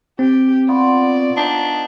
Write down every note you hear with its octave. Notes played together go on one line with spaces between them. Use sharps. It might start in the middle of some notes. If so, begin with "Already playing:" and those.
C4 G4
B3 F4 F#4 D5
D4 D#4